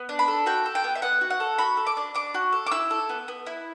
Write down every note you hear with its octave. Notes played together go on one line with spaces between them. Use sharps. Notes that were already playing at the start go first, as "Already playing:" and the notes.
Already playing: B3
D4
B5
A4
F#4 G5
A4
G5
B3
E5
B3 F#5
F#4
F#5
A4
F#4 B5
A4
D6
D4
D4 D6
F#4
A4
D6
E4 E6
A4
B3
B3
E4